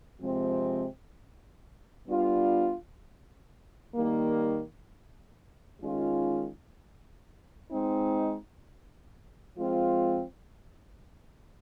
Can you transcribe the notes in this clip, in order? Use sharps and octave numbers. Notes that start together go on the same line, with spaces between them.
C3 F3 G#3 C4
G3 B3 D4 F4
D#3 G3 A#3
D#3 G#3 C#4 F4
G#3 C4 D#4
F3 G#3 C4 F4